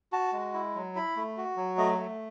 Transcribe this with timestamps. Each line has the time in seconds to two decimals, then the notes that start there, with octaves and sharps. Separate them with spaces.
0.13 F#4 A5
0.33 G#3
0.54 E4
0.75 F#3
0.95 E4 B5
1.16 A3
1.37 F#4
1.57 F#3
1.77 A3 D#5
1.99 A3